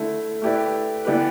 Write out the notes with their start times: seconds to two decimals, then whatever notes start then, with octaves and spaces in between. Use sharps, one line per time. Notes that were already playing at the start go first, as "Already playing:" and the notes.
Already playing: D3 A3 E4
0.42 A3 E4 G4 B4 D5
1.05 E3 B3 D4 G4 B4